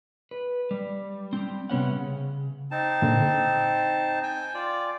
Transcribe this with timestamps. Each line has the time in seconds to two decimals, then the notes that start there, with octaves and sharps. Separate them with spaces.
0.31 B4
0.71 G3
1.33 G3 C4
1.70 C3 B3 C#4 F#5
1.93 C#3
2.71 C4 D#4 A5
3.02 A#2 D3
4.23 G5 G#5
4.54 F4 D5